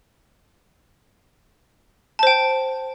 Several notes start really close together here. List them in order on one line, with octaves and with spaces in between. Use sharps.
A5 C5 G5